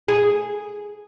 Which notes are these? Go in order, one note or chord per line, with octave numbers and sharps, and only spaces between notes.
G#4